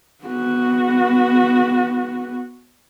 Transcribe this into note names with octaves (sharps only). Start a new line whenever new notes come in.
B3 F#4